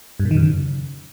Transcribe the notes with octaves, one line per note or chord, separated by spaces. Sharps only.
G2
A#2
D#3
F#2
C#3